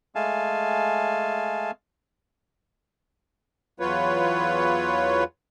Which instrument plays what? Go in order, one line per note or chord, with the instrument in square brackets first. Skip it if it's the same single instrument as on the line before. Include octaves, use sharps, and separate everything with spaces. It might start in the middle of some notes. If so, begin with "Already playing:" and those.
[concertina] G#3 A3 F5 G#5 A5
[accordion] E2 F#3 F4 B4 C#5